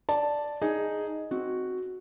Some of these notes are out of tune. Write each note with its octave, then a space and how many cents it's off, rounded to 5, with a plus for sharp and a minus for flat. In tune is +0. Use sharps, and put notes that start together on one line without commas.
D5 +0 A5 +0
D#4 +0 G#4 +0
C4 +0 F#4 +0